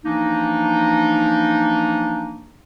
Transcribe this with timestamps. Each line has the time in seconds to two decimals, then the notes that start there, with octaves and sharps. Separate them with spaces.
0.04 E3 F3 A#3 D4 D#4